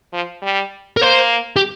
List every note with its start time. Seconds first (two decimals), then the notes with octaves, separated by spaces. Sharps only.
0.13 F3
0.42 G3
0.97 A#4
1.01 A#3 C5
1.56 G4